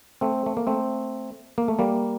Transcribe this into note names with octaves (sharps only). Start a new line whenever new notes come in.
A3 C4
A3
A#3
A3 C4
A#3
A3
G3 A#3